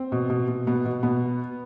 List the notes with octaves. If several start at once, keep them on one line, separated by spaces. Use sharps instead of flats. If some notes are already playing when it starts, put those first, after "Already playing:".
Already playing: C4
B2
B2
B2
B2 B3
B2
B2 B3